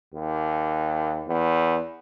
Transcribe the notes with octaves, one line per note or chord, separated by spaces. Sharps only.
D#2
E2